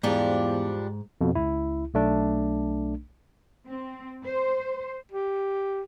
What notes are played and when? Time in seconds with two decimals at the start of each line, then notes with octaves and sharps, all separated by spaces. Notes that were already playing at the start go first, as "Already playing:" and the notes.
0.03 E2 G#2 F3 G3 D4
1.21 F2 B2
1.35 C#2 E4
1.94 B1 A3 D4
3.68 C4
4.26 C5
5.12 G4